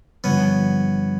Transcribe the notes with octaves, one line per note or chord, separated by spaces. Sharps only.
G2 D3 F3 B3 C#4